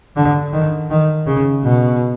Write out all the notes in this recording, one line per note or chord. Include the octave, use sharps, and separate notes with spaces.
D3
D#3
D#3
C#3
B2